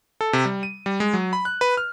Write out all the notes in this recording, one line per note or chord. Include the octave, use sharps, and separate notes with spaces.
A4
C3
G3
D#7
G3
G#3
F#3
B5
F#6
B4
F6